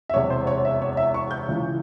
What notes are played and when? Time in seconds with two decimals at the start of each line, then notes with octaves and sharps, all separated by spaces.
0.09 E5
0.14 E1 E2 C3 C#5
0.30 C5
0.47 C#5
0.65 E5
0.82 C#5
0.97 E5
1.14 C#6
1.31 G6
1.49 C#2 C#3 E3